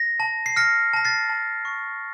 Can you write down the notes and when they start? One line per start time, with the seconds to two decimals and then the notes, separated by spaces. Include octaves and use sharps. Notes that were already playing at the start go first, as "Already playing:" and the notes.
Already playing: A#6
0.20 A5
0.46 C7
0.56 F6 A#6 C#7
0.93 A5 A#6
1.05 A6 C7
1.30 A5
1.65 C#6